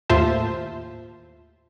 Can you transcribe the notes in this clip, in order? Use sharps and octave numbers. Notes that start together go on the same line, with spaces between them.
D#2 A2 F4 C5 E5 A5